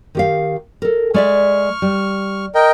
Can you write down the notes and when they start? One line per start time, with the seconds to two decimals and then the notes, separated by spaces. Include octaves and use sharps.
0.15 D#3 G4 F5
0.82 A4 A#4
1.14 G#3 D5 E5 C#6 F6
1.82 G3
2.55 A#4 D#5 G5